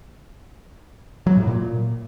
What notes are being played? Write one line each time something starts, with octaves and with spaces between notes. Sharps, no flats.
F#3
A2
A#2